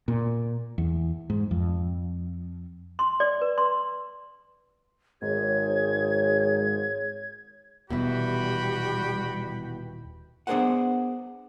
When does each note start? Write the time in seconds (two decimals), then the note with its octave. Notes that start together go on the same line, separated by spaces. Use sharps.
0.08 A#2
0.78 E2
1.30 G#2
1.51 F2
2.99 C6
3.20 D5
3.41 B4
3.58 C6
5.22 G#1 G#2 G#4 C#5 G#6
7.90 D#1 B2 E3 G3 F#4 G5 B5
10.47 B3 D4 G#4 A#4 C5 F#5